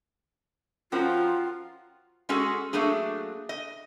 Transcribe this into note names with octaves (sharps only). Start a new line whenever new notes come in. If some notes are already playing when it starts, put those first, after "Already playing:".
F3 C#4 F4 F#4 A#4 G5
G#3 C#4 F#4 G#4 A4
F#3 A3 A#3 D4 G#4
D#5